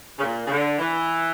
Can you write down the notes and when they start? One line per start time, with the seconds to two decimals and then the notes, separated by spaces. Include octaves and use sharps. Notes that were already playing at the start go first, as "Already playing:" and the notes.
0.18 C#3
0.23 A#2
0.47 C#3
0.51 D3
0.79 E3